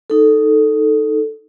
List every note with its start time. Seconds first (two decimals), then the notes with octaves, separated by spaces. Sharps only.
0.10 D#4 A4